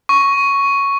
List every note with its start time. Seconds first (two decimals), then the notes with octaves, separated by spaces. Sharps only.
0.09 C#6